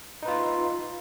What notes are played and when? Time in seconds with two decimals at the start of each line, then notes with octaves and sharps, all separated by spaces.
0.23 D#4
0.25 B4
0.28 F4